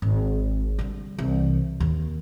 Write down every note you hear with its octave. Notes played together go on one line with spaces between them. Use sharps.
G#1
D3 G3
C2 E3
D#2